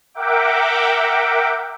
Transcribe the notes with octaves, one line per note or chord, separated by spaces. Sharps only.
A#4 E5 F#5 G5 D6